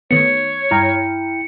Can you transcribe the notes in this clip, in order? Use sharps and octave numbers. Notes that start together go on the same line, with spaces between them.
D#3 A3 B3 C#5 C#7
G2 E4 G5 A#5 F6